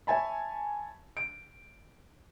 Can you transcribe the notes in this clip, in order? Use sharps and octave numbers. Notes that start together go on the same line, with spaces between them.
C#5 E5 G#5 A5 B5
D7